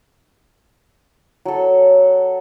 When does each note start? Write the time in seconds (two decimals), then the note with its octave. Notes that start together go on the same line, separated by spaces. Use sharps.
1.45 F#3 A4